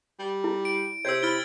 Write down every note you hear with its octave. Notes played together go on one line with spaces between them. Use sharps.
G3
E4
D7
C3 C#5 E6 G#6
E4 F6 A6 G7